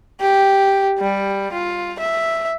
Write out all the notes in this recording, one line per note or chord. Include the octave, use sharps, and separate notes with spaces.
G4
G3
F4
E5